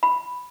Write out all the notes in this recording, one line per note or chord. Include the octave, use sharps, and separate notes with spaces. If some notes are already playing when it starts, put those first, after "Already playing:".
B5